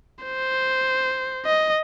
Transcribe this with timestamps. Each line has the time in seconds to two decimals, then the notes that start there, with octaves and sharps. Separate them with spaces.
0.25 C5
1.46 D#5